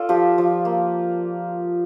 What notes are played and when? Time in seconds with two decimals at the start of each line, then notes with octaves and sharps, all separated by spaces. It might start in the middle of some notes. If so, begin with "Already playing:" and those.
Already playing: F4 A4 D5
0.09 F3 G4
0.38 F3
0.65 A#3